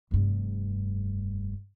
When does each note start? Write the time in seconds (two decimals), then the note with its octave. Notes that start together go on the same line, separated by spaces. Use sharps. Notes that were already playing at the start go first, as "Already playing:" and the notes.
0.11 F1 G2